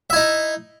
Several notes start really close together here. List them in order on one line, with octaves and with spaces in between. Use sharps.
E5 E4 D#4